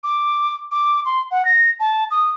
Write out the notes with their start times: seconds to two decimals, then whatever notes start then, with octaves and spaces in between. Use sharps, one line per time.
0.04 D6
0.71 D6
1.05 C6
1.31 F#5
1.45 A#6
1.80 A5
2.11 D#6